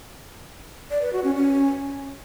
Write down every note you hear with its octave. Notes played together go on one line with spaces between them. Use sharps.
D5
B4
F#4
C#4
C#4